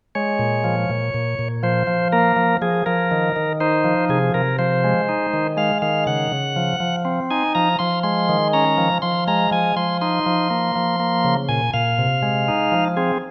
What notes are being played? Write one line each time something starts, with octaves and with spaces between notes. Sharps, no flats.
G#3 C#5
A#2
F3
A#2
A#2
A#2
F3 C5
F3
A#3 A#4
F3
F3 G#4
F3 A#4
D#3
D#3
D#4 C5
F3
C3 G#4
C3 A#4
F3 C5
G#3
D#4
D#3
G#3 F5
D#3 F5
C#3 F#5
C#3
F3
F3
C4
D#4 G#5
F3 A#5
F3 C6
G#3 C6
D#3
C#4 A#5
F3
F3 C6
G#3 A#5
F3 G#5
F3 C6
D#4 C6
F3
A#3
F3
A#3
C#3
A#2 G#5
A#2 F5
C3
G#3
D#4
F3
C4 G#4